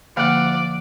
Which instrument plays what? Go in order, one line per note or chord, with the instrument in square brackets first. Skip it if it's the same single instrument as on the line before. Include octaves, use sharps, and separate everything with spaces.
[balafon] D3 A#3 [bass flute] F3 [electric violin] D5 [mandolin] F5 F#5